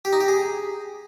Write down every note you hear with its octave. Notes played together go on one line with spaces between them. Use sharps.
G4
D#4
G4
G#4